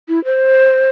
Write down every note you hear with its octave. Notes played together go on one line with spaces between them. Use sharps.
E4
C5